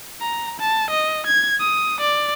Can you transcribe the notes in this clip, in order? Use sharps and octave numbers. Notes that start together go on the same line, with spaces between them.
A#5
A5
D#5
G#6
D#6
D5